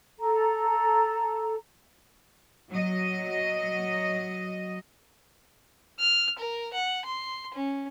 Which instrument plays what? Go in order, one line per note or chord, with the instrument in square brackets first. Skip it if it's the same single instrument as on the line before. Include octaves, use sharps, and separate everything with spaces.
[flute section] A4 A#5
[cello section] F#3 D#5
[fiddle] F6
A#4
F#5
C6
C#4